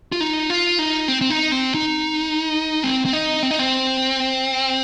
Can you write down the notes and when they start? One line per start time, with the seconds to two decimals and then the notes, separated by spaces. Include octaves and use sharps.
0.12 F4
0.21 D#4
0.50 F4
0.79 D#4
1.08 C4
1.21 C4
1.30 D#4
1.52 C4
1.74 D#4
2.83 C4
3.05 C4
3.13 D#4
3.43 C4
3.51 D#4
3.59 C4